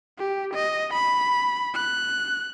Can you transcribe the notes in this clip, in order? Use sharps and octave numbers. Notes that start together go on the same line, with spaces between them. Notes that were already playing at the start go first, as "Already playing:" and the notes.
G4
D#5
B5
F#6